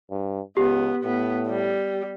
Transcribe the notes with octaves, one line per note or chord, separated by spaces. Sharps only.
G2
C#2 B3 G4
A2 B3
G3